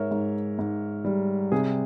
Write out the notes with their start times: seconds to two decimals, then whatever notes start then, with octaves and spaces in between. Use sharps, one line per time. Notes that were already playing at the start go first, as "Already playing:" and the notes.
Already playing: G#2 A#4 C#5 E5
0.11 G#2
0.59 G#2
1.05 G3
1.52 C3 G#4